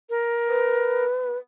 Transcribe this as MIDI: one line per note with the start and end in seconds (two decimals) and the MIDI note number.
0.10 1.05 70
0.47 1.37 71